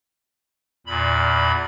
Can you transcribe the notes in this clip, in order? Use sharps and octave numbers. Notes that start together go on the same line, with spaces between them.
E2 A#2 B5